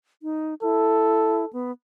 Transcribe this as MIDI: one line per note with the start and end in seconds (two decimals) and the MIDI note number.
0.23 0.54 63
0.63 1.45 64
0.63 1.50 69
1.53 1.71 59